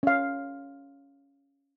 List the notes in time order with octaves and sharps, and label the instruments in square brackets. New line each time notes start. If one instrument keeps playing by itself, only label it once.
[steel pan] C#4 F5